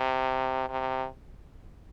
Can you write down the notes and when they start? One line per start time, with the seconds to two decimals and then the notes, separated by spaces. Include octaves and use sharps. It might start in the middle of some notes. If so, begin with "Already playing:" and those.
Already playing: C3
0.69 C3